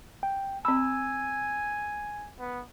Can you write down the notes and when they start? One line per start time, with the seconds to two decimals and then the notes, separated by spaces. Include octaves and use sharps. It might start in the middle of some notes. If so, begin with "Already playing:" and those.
0.23 G5
0.65 C4 G#5 B5 E6
2.39 B3